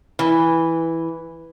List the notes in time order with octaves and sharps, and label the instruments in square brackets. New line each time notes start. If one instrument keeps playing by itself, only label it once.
[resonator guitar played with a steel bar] E3